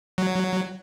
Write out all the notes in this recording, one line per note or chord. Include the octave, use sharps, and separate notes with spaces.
F#3